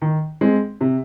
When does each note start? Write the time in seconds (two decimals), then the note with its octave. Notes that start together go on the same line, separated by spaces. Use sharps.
0.02 D#3
0.41 G#3 C4
0.81 C3